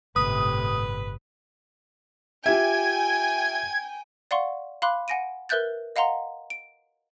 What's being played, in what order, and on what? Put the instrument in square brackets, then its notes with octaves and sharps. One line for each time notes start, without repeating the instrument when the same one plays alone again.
[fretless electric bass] G1 [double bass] A2 C3 [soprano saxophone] B4 [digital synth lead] D#6
[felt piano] F4 G4 E5 [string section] G5 G#5 [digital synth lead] G#6
[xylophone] D5 F5 F#5 C6 C#6
F5 B5 C6 D6 F#6
F#5 G#5 A#6 D7 D#7
A#4 B4 E5 F#6 G6 A6
D#5 F5 F#5 A#5 C6
D7